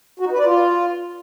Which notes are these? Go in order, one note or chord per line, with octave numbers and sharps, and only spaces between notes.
F#4
D#4
B4
D5
F4